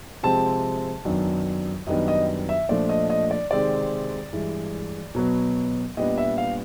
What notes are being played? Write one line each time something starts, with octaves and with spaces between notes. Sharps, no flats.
C3 F3 G#3 C4 A5
F#2 D#3 F#3 B3 D4
F#2 D#3 G3 B3 D4 D#5
D#5
E5
A#2 F3 A3 D4 D5
D#5
D#5
D5
C3 D#3 G#3 C4 D5
G2 E3 G#3
B2 F#3 B3
A#2 G3 B3 D4 D#5
E5
F5